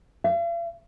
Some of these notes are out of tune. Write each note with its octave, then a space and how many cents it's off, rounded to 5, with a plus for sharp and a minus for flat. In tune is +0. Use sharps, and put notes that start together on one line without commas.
F5 -45